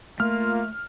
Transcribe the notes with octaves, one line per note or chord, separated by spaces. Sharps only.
A3 A#3 F4 F6